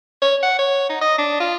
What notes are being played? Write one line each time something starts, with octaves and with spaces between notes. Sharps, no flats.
C#5
F#5
C#5
D#4
D#5
D4
F4